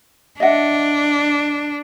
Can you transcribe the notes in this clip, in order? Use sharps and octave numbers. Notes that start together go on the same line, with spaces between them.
D4 D#5 E5 F#5